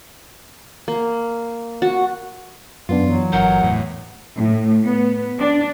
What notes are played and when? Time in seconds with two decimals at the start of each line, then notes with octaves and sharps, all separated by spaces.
0.88 A#3
1.82 F#4
2.89 F#2 B3 D4 F4
3.08 E3 F#3
3.32 G1 A#4 F#5 G6
3.62 E2 A2
4.37 A2
4.83 B3
5.40 D4